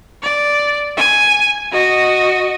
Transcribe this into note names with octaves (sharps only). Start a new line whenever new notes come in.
D5
G#5
F#4 D#5